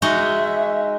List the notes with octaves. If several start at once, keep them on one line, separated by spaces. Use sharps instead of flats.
G#3 D#4 F#4 E5